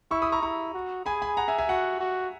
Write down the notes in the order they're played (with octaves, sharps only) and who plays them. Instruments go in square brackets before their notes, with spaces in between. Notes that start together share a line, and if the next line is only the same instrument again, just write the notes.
[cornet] E4 [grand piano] C#6 E6
[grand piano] B5 D#6
A#5 C#6
[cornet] E4 [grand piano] A#5 C#6
[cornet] F#4
[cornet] G#4 [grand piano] G#5 B5
[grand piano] G#5 B5
F#5 A#5
E5 G#5
E5 G#5
[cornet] F#4 [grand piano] F#5
[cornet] F#4